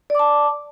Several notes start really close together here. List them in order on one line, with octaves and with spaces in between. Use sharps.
D5 D6 A5